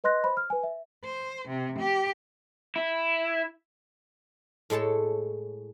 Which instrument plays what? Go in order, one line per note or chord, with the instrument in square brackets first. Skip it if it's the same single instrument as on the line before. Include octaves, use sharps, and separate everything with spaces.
[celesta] B4 D#5 C6 F#6 A#6
C5 B5
F6
B4 G#5
E5
[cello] C5
C3
G4
[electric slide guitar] E4
[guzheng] A2 G#3 A4 C#5 A5